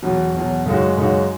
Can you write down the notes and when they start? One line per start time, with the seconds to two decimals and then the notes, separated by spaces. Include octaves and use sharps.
0.03 E2 B2 F#3
0.34 E2 B2 F#3
0.66 F#2 C#3 G#3 D#4 F#4
0.97 F#2 C#3 G#3 D#4 F#4